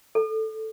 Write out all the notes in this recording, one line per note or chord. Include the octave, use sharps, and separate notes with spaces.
A4